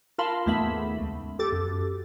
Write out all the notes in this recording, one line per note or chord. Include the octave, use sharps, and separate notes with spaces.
F4 A#4 F5 A5 B5 C6
D#2 G#2 A3 B3 E5 B5
C#2
G4 A4 D6 A6
F#2